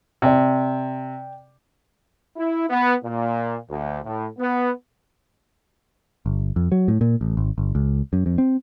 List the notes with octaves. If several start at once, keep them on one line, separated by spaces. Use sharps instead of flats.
C3 D5 G5
E4
B3
A#2
D2
A2
B3
G1
F2
F#3
A2
A#2
A1
G#1
G1
C#2
F#2
F2
C4